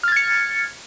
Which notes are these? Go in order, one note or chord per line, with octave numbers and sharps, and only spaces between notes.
F6 G#6 A6 C#7